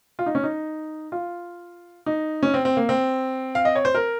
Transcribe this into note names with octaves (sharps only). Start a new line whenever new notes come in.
F4
D#4
C#4
D#4
F4
D#4
C#4
C4
C4
A#3
C4
F5
D#5
C#5
C5
A#4